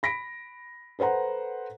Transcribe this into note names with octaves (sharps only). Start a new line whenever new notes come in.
B5 A#6 B6 D7
A4 B4 C5 F#5 A#5